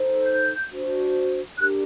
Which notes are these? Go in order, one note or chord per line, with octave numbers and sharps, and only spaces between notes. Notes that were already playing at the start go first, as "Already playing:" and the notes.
Already playing: D#4 A4 C5
G6
D4 F#4 C5
D4 G4 A#4 F#6